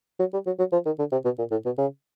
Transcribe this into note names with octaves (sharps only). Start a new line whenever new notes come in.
F#3
G3
F#3
F#3
F3
D#3
D3
C3
B2
A#2
A2
B2
C#3